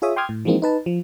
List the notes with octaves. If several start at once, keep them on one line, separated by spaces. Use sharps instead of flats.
F4 G#4 C#5 E5 D#6
G5 C6 D6 D#6 F6 G#6
A2
E3 F3 G#3 A#3 C4 D#4
D#4 B4 A5
F3